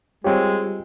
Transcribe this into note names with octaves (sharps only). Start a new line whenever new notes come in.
G3 G#3 C4 F4 G4 C#5